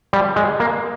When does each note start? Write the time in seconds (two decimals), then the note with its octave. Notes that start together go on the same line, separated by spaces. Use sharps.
0.13 G3
0.36 G#3
0.60 A#3